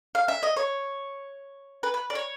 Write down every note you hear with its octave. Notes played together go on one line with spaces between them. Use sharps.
F5
E5
D#5
C#5
B4
B4
D5
C#5